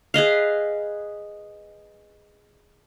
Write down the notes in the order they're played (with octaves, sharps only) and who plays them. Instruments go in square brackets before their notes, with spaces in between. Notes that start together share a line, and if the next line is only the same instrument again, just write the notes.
[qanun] G#4 B4 D#5 F5